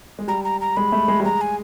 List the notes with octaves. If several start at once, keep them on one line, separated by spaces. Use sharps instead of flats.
G#3
G3 A#5
A#5
A#5
G#3 B5
A3
G#3
G3
G#3 A#5
G#5